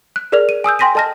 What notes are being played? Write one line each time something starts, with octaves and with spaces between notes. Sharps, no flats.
F#6
G#4 A#4 D5 F6 F7
D#7
G#5 D#6 E6 G6
G5 G#5 C6 A#6 B6 D#7
A4 D#5 A5 F6 A#6